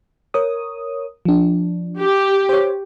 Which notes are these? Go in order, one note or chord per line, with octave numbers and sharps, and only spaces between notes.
A#4 C#5 D#6
F3 D4
G4
C5 C#5